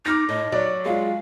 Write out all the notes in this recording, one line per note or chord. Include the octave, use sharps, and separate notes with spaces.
D#4 D6 F6 A#6
A2 D#5
F#3 D5
G#3 F4 F5